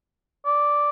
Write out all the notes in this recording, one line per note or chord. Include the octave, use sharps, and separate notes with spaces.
D5